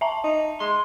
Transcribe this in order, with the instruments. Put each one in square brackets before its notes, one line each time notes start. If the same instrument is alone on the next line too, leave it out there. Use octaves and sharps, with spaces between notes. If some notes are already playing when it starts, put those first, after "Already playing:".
[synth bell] E5 A5 A#5
[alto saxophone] D#4
[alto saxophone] G#3 [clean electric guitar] C6